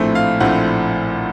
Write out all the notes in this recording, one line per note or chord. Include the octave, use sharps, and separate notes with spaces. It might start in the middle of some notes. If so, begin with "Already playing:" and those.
Already playing: A#1 A2 A3 C4
F5
A#1 A2 A3 C4 F#5